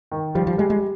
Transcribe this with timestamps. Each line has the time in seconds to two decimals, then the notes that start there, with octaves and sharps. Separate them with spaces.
0.12 D#3
0.35 F3 G3
0.47 F3
0.58 G3 G#3
0.70 G#3